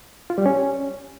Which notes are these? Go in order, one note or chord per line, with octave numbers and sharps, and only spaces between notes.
F4
G3
C#4